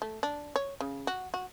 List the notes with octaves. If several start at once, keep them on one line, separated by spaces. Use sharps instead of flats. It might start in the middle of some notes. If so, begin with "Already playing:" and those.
A3
D4
C#5
C#3
F#4
F#4